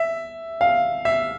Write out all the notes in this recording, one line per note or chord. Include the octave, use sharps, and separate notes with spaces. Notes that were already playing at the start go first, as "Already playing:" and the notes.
Already playing: E5
F5
E5